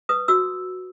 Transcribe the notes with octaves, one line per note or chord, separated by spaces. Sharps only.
B4 D#6
F#4 E6